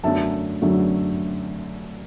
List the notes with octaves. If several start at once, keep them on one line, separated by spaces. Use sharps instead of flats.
F#2 D3 F#3 A3 E5 A5
F#2 D3 F#3 A3